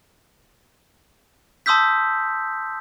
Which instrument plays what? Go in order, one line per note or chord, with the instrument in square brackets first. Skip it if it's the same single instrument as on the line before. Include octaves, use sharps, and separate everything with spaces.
[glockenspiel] A5 C6 D#6 E6 G6 B6